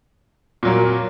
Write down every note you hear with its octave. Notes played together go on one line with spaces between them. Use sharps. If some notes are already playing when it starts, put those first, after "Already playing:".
A#2 F#3 A#3